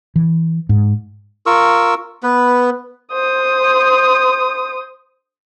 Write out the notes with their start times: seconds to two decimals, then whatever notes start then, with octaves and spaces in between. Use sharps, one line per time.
0.16 E3
0.69 G#2
1.46 F4 A#4 C#6 E6
2.23 B3 B4
3.12 C5 D#6